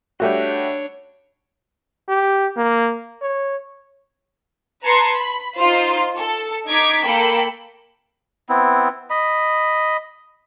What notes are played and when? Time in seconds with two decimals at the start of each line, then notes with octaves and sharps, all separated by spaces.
0.20 G3 A3 D4 F#4 C#5
2.08 G4
2.57 A#3
3.22 C#5
4.84 B4 A5 A#5 C6 G#6 C#7
5.13 B5
5.57 D#4 F4 C5
6.17 A4
6.68 D#4 D6 G#6 B6
7.04 A#3 A4 G5 B5
8.49 B3 C4 E4
9.10 D#5 B5